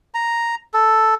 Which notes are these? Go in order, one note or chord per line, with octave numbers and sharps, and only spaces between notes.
A#5
A4